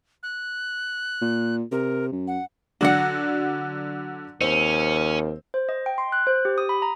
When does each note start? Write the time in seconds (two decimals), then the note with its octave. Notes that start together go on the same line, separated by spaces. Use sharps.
0.23 F#6
1.22 A#2
1.72 C3 A#4
2.12 F#2
2.28 F#5
2.81 D3 F#3 D4 F#4 F#5
4.41 D#2 C4 C#4
5.54 C5
5.69 D#5
5.86 G5
5.98 C6
6.12 F#6
6.27 C5
6.45 G4
6.58 D#6
6.69 B5
6.82 A#5